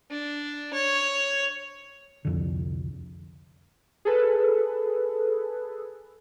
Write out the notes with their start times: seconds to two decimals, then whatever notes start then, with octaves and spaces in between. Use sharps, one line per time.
0.11 D4
0.73 C#5
2.25 C2 F2 D3
4.05 G#4 A4 B4